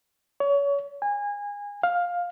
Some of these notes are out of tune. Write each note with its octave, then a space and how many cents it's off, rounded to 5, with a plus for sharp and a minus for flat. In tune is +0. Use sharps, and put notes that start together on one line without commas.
C#5 +30
G#5 -25
F5 +10